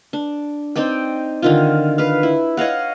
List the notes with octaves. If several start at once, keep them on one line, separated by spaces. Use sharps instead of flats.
D4
C4 D#4 D5 G5
D3 D#3 F4
B4 F5
E4
C#5 D#5 F5 F#5